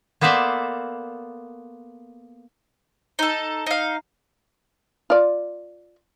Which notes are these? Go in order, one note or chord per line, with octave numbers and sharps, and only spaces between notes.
A#3 B3 A4 C5 D5 E5
D#4 A4
D#4 F5
F4 D5